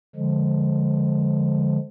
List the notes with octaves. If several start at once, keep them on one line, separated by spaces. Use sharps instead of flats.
D3 F3 G#3